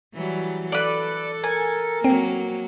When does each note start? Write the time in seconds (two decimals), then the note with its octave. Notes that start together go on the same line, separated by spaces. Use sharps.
0.14 E3 F#3 G3
0.72 A4 B4 D5
1.44 A#4 G#5
2.04 F#3 A#3 C4